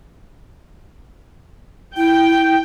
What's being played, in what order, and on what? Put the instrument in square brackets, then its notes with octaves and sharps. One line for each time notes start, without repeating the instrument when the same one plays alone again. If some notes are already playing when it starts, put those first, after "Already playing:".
[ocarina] E4 [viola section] G5